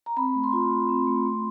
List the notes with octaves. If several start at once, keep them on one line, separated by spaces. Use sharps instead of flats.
A#5
C4 B5
A3
C6
F4
A3
C4
A3
A3